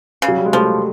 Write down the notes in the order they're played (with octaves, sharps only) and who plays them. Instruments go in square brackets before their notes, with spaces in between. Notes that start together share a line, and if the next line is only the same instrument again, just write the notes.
[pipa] C#3
[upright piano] F#3
G3
G#3
[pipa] F3 [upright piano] G3 A3